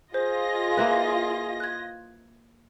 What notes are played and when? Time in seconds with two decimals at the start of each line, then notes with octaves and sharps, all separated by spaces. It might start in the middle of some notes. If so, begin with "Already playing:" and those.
0.14 F4 G#4 C5 D#5 A#6
0.77 A#3 E4 B4
1.60 F#6 G#6